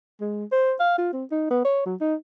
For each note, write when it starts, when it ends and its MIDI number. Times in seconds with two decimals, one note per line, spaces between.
0.21 0.45 56
0.52 0.74 72
0.80 0.96 77
0.98 1.12 65
1.13 1.24 60
1.31 1.47 63
1.50 1.63 59
1.65 1.83 73
1.86 1.95 54
2.01 2.15 63